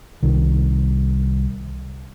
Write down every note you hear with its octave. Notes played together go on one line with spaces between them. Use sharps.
C2 D#3